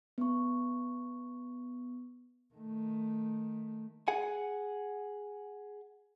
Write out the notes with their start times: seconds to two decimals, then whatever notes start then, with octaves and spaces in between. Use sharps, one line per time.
0.18 B3 C#6
2.54 D#3 A3
4.08 G#4 F#5 G#5